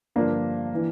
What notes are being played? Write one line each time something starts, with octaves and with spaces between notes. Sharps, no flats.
G2 D3 F3 A#3 D4
E3